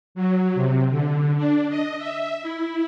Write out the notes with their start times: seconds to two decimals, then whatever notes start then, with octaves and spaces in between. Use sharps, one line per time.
0.15 F#3
0.55 C3
0.90 D3
1.36 D4
1.69 D#5
1.98 E5
2.42 E4